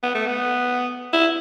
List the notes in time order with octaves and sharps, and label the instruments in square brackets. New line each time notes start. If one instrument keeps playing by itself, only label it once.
[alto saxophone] B3
A3
B3
E4